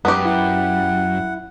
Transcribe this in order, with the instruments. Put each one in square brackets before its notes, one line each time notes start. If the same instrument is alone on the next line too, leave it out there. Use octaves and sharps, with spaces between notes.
[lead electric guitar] F#2 [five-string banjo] B3 G4
[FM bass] E4 [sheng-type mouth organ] F#5